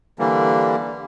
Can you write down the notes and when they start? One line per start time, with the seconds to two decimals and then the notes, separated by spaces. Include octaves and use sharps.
0.19 D3 E3 G3 A#3